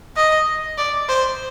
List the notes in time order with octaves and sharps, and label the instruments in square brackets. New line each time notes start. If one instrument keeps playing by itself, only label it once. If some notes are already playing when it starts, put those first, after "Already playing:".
[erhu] D#5
D5
C5